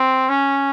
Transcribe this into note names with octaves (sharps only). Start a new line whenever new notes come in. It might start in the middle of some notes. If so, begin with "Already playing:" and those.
Already playing: C4
C#4